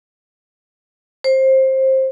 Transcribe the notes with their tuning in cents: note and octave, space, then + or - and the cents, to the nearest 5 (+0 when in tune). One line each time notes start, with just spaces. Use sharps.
C5 +20